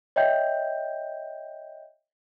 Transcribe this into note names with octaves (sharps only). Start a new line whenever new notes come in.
C#5 D#5 E5 G5 G6